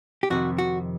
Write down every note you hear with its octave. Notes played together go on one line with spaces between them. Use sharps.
G4
F2 C3 D#3 F#4
F#4